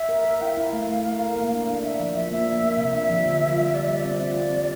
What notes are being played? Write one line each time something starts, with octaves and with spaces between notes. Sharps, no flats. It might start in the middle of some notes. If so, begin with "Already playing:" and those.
Already playing: E5
A#4
A#4
E4 F5 G5
E4
A3
A3
A#4
A#4
A#3
D4
D4
D4 E5
F3
F3 E5
A#3 E5
A#3
A#3
C3 E5 F5
D4
F3
D3
F4
G3
G3 D5
G3 E5
D5
C4
F4
C4
G3